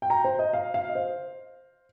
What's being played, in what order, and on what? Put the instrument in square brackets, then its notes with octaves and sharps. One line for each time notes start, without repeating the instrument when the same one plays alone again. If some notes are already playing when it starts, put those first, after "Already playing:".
[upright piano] G5
A#5
C5
D#5
F5
F5
D#5
C5